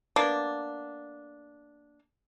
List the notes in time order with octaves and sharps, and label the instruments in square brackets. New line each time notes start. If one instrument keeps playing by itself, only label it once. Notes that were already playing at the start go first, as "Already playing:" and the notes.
[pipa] A#3 B3 D4